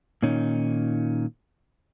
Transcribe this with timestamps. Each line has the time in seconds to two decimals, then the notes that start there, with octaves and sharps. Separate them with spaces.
0.23 A#2 D#3 C#4 D#4